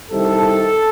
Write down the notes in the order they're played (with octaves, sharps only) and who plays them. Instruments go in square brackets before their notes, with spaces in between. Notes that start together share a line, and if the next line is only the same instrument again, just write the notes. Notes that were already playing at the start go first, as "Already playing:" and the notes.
[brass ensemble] C2 C3 D#3 A4